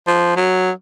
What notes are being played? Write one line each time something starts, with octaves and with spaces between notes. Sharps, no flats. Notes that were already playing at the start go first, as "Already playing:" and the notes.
F3
F#3